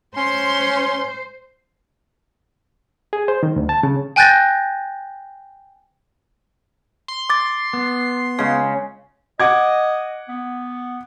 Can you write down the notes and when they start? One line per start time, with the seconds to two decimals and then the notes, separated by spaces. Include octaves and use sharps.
0.17 C#4 C5 C6
3.13 G#4
3.28 C5
3.43 D#3
3.56 D2
3.69 A5
3.83 C#3
4.16 G5 G#5 F#6 G6 A6 A#6
7.08 C6
7.30 D6 A6
7.73 B3
8.39 C#3 G#3
9.40 D#5 F#5 D6 G#6
10.28 B3